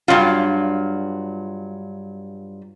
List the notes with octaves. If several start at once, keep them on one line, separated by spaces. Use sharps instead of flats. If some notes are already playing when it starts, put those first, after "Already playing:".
G2 D#3 F#3 F4